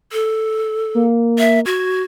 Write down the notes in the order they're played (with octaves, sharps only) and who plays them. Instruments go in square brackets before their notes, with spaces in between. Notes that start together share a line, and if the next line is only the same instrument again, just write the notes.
[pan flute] A4
[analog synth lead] A#3
[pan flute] E5
[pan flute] F#4 [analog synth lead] G#6